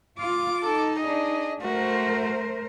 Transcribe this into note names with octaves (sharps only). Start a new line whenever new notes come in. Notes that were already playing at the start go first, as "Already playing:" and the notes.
F4 D6
D#4 A4
D4 G#4 D#5
A3 F#4 A#4 C5